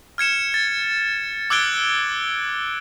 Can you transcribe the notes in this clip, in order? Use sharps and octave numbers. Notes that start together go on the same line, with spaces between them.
F6 G#6 C#7 E7
A6
D6 E6 F#6 G#6 D7 G7